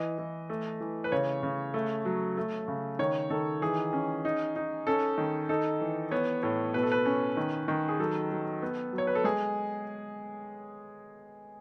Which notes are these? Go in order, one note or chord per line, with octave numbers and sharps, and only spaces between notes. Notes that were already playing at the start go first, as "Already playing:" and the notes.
Already playing: E3 D#5
E3
A3
E3
B4
C#3 C#5
C#3
A3
F#3
A3
C#3
D#3 C#5
D#3 A4
E3 G#4
C#4
D#4
D#4
C#4 A4
D#3
D#4 A4
E3
B3 C#5
A2 C#5
B2 B4
A4
B4
C#4
D#3
D#3
G#4
F#3 A4
F#3
B3
F#3
C#5
B4
A4
G#3 G#4